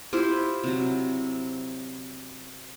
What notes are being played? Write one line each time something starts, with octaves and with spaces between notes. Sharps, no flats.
E4 F4 G4 C5
C3 F#3